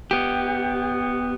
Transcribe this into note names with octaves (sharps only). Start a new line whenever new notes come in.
B3 G4